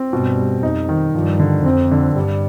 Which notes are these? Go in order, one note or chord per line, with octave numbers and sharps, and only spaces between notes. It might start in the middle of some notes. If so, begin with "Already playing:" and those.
Already playing: C4
G2 B2
G3
F2 D#4
D#3
G2 F3
D3
F2 C4
D3
G2 G3